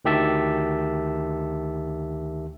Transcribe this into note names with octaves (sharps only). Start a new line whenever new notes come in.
D2 D#3 G4 E5 A5